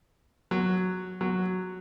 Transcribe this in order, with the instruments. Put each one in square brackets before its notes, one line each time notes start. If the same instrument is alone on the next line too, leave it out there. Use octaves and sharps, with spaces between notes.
[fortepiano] F#3
F#3